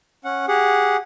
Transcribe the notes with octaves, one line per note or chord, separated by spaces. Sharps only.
C#4 F#5
G4 G#4 F#5